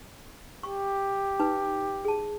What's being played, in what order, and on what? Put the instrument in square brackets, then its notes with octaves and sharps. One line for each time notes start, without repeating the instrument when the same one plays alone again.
[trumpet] G4 [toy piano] C#6
[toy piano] D#4 B4
G#4 A5